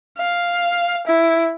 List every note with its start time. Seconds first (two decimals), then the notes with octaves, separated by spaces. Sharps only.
0.18 F5
1.07 E4